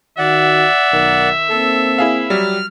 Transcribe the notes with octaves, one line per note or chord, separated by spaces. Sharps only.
D#3 F#4 D5 E5 F#5
B1 D#3 A#4
A#3 C4 A4
E4 G#4 F5
F#3 G3 F6